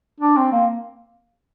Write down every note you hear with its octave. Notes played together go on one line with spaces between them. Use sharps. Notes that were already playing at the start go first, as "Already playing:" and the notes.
D4
C4
A#3